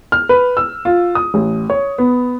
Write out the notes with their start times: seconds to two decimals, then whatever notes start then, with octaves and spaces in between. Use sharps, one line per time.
0.12 F6
0.29 B4
0.57 E6
0.85 F4
1.15 D#6
1.34 A1
1.70 C#5
1.98 B3